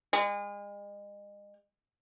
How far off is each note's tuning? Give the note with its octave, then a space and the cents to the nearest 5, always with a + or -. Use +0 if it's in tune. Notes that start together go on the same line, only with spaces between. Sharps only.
G#3 -35